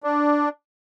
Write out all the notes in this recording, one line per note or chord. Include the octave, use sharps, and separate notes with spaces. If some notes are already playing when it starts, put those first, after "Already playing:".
D4